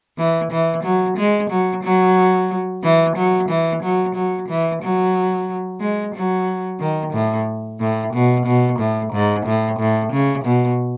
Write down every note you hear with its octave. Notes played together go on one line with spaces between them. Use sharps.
E3
E3
F#3
G#3
F#3
F#3
E3
F#3
E3
F#3
F#3
E3
F#3
G#3
F#3
D#3
A2
A2
B2
B2
A2
G#2
A2
A2
C#3
B2